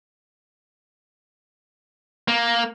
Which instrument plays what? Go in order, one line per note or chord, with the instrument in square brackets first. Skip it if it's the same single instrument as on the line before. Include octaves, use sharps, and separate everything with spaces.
[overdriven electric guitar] A#3